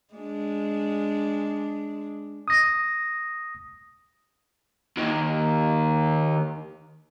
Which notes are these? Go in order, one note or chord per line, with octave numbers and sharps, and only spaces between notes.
G#3 D4
D#6 A#6
D#2 D#3